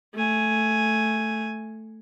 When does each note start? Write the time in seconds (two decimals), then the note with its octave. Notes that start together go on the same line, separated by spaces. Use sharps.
0.15 A3 G#5